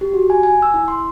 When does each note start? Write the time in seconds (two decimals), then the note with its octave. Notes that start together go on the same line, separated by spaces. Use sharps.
0.01 G4
0.14 F#4
0.30 G#5
0.43 G#5
0.62 E6
0.74 E4
0.88 C6